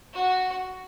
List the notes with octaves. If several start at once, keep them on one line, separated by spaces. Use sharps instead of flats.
F#4